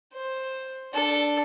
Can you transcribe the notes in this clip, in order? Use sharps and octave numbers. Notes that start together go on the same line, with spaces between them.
C5
D4 A4